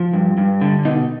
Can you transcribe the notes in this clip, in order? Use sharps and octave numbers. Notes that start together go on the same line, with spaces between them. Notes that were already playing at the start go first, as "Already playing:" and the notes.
Already playing: F3
G2
G2
D3
B2 D#4